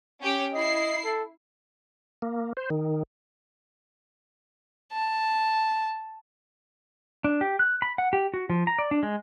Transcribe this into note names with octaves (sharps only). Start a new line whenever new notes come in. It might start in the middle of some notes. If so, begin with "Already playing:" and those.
C#4 G4 G5
E4 D#5 C7
A4
A#3
C5
D#3
A5
D4
G4
F#6
B5
F#5
G4
F#4
F3
A#5
D5
D4
G#3